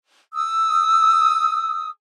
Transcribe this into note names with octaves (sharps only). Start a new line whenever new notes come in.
D#6 E6